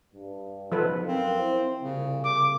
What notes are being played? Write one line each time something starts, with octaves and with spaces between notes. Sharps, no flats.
G2
C#2 G#2 B2 F3 A4 B4
F#2 C4 A#4 F5
E4 C5
C2 F2 A#2 C#3
C#3 D6